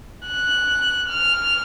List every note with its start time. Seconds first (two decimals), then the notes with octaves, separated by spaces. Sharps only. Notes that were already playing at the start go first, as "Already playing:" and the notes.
0.27 F#6
1.08 F6